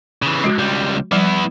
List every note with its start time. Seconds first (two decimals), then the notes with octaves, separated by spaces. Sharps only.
0.22 C#3 E3
0.44 G#3 F#4
0.58 C#2 G3
1.12 F3 G3 B3 E4